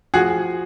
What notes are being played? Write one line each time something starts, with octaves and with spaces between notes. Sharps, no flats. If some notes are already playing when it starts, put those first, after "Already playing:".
F3 F#4 G#4